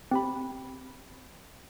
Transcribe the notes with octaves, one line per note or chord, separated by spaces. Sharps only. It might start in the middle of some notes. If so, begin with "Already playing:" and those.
C4 G4 B5